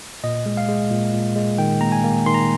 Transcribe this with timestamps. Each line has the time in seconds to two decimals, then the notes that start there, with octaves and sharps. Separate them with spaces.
0.24 A#2 D#5
0.46 G#3
0.57 F5
0.68 G#3
0.91 A#2
1.13 A#2
1.36 G#3
1.58 D#3 G5
1.81 A#3 A#5
1.92 G#5
2.04 A#3
2.26 D#3 C6
2.34 A#5